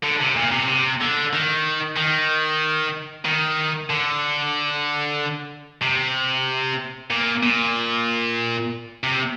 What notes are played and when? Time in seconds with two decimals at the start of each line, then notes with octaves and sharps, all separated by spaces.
0.03 D3
0.21 C3
0.36 A#2
0.52 C3
0.68 C3
1.01 D3
1.33 D#3
1.97 D#3
3.25 D#3
3.90 D3
5.82 C3
7.10 A#2
7.43 A#2
9.03 C3